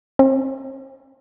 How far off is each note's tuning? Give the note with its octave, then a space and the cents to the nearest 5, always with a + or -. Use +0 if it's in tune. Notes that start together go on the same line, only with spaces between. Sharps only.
C4 +40